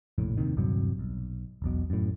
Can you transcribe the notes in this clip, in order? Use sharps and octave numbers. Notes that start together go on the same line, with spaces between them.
F1 A#1 A2
D#2 C3 D#3
D#1 G2 C3 F#3
B1
E1 B1 B2
F#2 A2